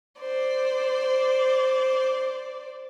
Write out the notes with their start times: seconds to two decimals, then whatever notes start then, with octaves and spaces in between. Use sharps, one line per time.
0.19 C5 D5